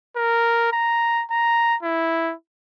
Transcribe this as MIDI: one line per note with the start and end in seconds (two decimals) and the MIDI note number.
0.16 0.69 70
0.73 1.23 82
1.31 1.76 82
1.83 2.33 64